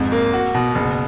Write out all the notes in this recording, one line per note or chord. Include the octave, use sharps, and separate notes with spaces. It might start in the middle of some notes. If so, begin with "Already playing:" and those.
Already playing: F2 G#2
A#3
F#4
B2
F#1